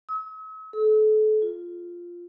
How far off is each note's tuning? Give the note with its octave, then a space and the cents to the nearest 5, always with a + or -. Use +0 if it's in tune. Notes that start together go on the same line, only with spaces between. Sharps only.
E6 -45
A4 -35
F4 +0